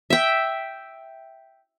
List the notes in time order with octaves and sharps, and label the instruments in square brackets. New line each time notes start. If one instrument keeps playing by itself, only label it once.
[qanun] E5 G5